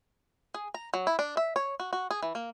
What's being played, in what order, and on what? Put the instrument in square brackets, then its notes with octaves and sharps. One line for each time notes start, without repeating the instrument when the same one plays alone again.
[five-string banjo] G#4
A#5
F#3
E4
D4
E5
C#5
F#4
F#4
G#4
E3
A#3